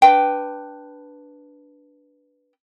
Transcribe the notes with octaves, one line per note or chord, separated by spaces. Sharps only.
D4 B4 G5